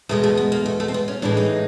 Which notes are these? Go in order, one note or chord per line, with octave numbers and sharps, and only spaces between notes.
E2 B2 G#3 A3
A3
B3
A#3
A3
A3
C4
B3
C#4
A2 E3 G#3 D4
D#4